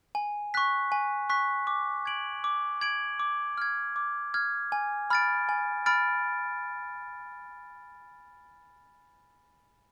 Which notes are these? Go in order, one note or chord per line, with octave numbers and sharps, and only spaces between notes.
G#5
C#6 F#6 B6
G#5
C#6 F#6 B6
D6
G#6 D7 F#7
D6
G#6 D7 F#7
D6
F6 G#6
D6
F6 G#6
G#5
B5 F6 A6 D7
G#5
B5 F6 A6 D7